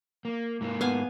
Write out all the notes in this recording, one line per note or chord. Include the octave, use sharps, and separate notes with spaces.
A#3
G#2 A#3
B3 F5 G#5